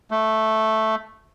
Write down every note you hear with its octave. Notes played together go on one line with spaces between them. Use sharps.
A3